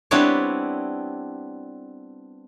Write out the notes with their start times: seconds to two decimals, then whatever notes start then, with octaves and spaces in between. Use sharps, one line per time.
0.11 G3 B3 C4 D4 E4 C#5